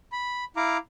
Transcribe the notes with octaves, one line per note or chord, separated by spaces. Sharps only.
B5
E4 F5 A#5 D6